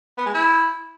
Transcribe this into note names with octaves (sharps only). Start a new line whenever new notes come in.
B3
G#3
E4